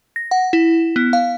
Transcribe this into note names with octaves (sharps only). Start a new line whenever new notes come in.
A#6
F#5
E4
B3
F5